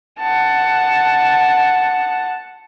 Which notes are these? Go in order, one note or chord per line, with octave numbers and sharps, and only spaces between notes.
F#5 A5